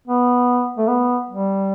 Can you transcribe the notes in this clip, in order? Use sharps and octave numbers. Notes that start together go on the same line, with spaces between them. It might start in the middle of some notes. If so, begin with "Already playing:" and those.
B3
A3
B3
G3